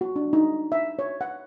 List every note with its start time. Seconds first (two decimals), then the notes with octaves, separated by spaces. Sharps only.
0.01 F#4
0.16 D4
0.33 D#4
0.72 E5
0.99 C#5
1.21 F#5